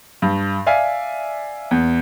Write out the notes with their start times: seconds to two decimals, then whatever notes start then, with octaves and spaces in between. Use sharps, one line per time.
0.22 G2
0.66 D5 E5 F5 G#5
1.71 E2